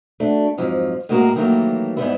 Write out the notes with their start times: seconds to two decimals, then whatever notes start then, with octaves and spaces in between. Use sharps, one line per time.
0.20 A3 D4 F#4
0.58 F2 G#2 F3 F#3
1.09 A2 G#3 A#3 F#4 A#4
1.36 D#3 E3 F#3 A3 A#3 G4
1.97 G#2 G3 B3 E4